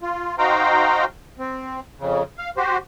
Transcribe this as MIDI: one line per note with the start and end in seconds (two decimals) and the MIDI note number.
0.02 0.35 65
0.38 1.05 63
0.38 1.05 66
0.38 1.05 72
0.38 1.05 77
0.38 1.05 79
0.38 1.05 82
1.39 1.80 60
1.99 2.23 41
1.99 2.23 49
2.38 2.50 77
2.57 2.77 66
2.57 2.77 67
2.57 2.77 72